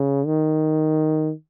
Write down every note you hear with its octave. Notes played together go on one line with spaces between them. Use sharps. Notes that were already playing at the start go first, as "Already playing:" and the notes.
Already playing: C#3
D#3